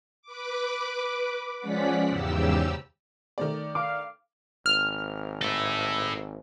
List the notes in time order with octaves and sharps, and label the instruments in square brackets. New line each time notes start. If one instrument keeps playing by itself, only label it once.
[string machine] B4 D6
F3 G#3 C#4 D5 F#5 B6
E2 G#2 C#3 G4 E6
[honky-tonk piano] D#3 A3 D5
[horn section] F5 [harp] D6
[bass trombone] G#1 [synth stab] F6
[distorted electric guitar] E4 A4